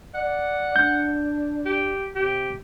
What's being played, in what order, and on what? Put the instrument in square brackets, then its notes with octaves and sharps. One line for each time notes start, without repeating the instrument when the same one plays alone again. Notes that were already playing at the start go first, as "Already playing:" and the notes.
[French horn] D5 [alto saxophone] F#5
[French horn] D4 [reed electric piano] G6
[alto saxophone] G4
[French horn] C3 [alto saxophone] G4